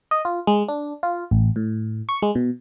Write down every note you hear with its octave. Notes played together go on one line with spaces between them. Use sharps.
D#5
F4
G#3
D4
F4
A1
A2
C#6
G#3
B2